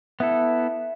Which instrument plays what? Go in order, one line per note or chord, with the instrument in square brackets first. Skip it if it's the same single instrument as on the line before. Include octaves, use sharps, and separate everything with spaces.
[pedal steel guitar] B3 E4 A4 [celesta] E5